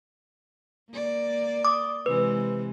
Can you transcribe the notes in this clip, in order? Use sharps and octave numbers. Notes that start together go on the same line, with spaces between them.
A#3 D5
D6 D#6
C3 E3 G#3 B4